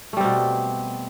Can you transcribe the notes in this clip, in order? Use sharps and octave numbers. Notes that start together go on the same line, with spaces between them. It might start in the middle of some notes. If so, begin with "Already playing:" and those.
B2 G3 A3 C4